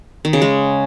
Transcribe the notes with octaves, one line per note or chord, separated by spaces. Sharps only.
D#3
C#3
G#3